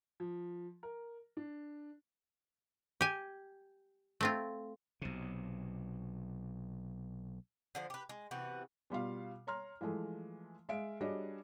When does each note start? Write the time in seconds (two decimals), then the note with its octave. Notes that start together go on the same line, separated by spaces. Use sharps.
0.20 F3
0.83 A#4
1.37 D4
3.01 G4 G#5
4.21 A3 C4 F4
5.02 B1 C3
7.75 D3 F3 C5
7.90 G4 B4
8.09 G#3
8.31 C3 E3 B3 F#4
8.90 B2 G3 F4 F5
9.47 C#5 A#5 C6 F6
9.81 E3 F3 G#3 A3
10.69 G#3 E5 F5 D7
11.01 G3 D4 F#4 G#4 C#5 D#5